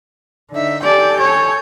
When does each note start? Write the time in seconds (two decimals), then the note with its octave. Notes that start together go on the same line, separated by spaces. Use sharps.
0.51 D3 D#4 E5
0.83 G4 A4 D5 G#5 G6
1.20 C#5